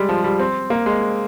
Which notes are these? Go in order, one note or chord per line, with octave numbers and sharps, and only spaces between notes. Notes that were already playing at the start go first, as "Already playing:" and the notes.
Already playing: G3 G#3
F3
G3
C4
A#3
G#3